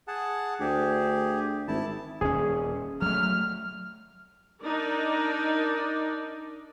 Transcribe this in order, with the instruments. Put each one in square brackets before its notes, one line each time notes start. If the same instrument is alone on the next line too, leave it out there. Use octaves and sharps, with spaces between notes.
[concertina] G#4 F#5 A5
[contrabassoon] D2 [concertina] G4 G#4
[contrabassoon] G#1 [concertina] E4 A5
[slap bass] D#1 C#4 [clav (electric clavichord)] G#4
[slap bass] F#3 A3 [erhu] F6
[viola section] D4 D#4 A#4 D5